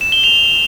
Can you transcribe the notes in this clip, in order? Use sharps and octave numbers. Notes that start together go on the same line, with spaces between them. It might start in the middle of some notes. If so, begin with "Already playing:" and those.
E7
G7
F7